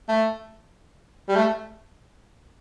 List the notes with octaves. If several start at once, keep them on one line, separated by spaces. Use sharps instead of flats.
A3
G3
A3